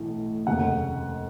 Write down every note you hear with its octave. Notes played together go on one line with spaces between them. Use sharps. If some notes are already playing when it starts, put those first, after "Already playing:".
Already playing: B1 A2 E3
F1 D#2 C#3 F#5